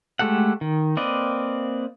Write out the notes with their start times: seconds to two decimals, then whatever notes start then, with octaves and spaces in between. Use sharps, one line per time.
0.19 G#3 A3 G4 A4 F#5
0.61 D#3
0.97 A#3 C4 B4 D5 D#5